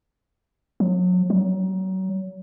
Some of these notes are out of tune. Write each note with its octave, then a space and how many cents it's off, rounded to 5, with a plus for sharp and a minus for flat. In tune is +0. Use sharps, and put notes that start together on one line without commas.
F#3 -35
F#3 +30